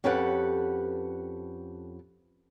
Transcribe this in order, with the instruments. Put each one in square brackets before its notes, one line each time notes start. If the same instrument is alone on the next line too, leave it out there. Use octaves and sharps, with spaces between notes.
[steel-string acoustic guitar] F2 C#4 G4 A4 B4 F#5